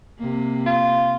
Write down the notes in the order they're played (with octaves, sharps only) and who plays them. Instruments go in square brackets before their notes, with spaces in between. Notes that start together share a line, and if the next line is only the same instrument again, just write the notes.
[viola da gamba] C3 A#3
[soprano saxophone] F4